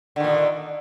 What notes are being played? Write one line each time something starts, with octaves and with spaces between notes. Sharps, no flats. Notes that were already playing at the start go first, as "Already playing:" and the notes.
A#2 D3 D#3